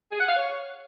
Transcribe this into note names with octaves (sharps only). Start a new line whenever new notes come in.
G#4
F#5
F5
C#5